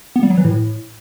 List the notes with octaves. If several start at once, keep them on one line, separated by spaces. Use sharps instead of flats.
B3
G3
F#3
E3
A2